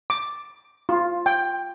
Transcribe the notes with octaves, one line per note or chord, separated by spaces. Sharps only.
D6
F4
G5